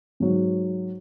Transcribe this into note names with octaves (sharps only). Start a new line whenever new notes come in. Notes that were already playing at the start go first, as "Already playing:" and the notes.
G#2 F#3